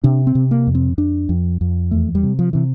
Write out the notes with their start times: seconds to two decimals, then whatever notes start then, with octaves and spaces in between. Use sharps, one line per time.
0.04 C3 D4
0.27 C4
0.35 C3
0.51 A#3
0.67 F2
0.75 C4
0.98 F2 D4
1.29 F2
1.61 F2
1.91 E2 A3
2.15 G3
2.23 C3
2.39 F3
2.53 C3 E3